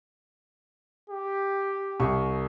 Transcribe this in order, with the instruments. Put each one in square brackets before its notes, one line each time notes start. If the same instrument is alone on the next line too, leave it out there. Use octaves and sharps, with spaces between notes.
[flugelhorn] G4
[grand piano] C2 C#6